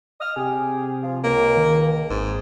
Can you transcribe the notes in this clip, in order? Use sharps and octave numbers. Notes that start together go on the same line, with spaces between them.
D#5 D#6 F6
C3 G4 G#4
F3 F4
C#2 A#3
D#3
G#1 G#2